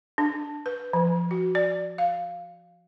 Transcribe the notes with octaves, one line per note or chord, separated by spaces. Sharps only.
D4
B4
F3
F#4
D5
F5